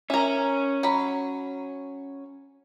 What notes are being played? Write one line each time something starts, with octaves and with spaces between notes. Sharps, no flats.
C#4 A#4 E5
F#3 B5